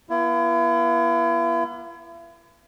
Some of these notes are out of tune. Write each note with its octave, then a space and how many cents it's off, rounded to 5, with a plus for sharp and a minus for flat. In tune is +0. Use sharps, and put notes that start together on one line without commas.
B3 -40 E4 +40